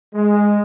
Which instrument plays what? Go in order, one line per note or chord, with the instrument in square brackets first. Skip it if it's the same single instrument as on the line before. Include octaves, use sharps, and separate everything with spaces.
[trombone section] G#3